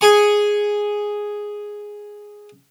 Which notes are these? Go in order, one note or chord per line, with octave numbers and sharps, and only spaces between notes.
G#4 G#5 C#6